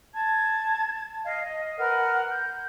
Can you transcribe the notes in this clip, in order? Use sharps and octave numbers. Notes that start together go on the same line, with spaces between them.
A5 G#6
D#5 F5
D#5
A#4 B4 F#5 F6
G6